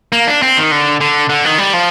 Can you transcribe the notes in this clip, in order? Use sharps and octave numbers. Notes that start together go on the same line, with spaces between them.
A#3
D4
C4
D#3
D3
D3
D3
D#3
G3
F3